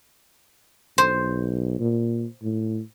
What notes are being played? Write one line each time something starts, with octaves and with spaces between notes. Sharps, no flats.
B1 C5
A#2
A2